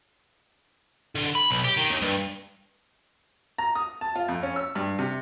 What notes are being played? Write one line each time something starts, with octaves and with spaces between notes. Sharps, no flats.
D3
B5
B1
G4
D#3
D#2
G2
A#5
D#6
A5
F4
F2
C#4
E6
G2
C3